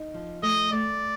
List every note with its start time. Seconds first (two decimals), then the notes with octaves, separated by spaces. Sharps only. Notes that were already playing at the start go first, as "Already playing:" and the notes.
Already playing: D#4
0.14 F3
0.43 A3 D#5
0.72 A3 D5